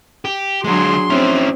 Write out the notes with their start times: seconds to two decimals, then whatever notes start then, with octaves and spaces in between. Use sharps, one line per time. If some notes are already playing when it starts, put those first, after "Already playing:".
0.25 G4
0.64 D3 F#3 G#3 D4 G#4 C6
1.10 C4 C#4 E4